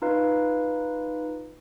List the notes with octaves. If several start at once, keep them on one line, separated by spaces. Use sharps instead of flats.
D#4 F4 B4 F5